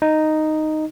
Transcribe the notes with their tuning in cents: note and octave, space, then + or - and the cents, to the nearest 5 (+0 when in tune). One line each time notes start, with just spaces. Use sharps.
D#4 -5